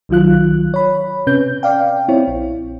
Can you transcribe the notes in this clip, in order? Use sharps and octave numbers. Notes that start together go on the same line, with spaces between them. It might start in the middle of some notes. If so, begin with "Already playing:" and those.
C2 D#3 F#3 F4 F#6
C#5 B5
C3 C#4 B4 G6
D5 F5 G5
C4 E4 C#5
A#1